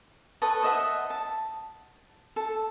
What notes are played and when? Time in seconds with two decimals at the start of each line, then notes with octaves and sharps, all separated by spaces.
0.42 A4 B4 C#5 D#6
0.63 C5 D#5 E5 F#5
1.10 A5
2.36 A4